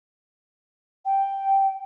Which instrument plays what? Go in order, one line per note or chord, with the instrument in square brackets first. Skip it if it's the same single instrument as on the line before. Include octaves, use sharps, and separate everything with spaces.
[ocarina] G5